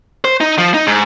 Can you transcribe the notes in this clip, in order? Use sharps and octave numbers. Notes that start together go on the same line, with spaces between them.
C5
D#4
F3
D#4
G#2